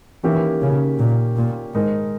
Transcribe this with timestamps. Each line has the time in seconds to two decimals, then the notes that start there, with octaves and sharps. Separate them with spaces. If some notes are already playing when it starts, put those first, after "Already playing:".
0.23 D#3 E3 A#3 C#4 G4
0.61 C#3
0.99 A#2
1.37 A#2
1.74 G#2 D#3 G#3 D#4 A#4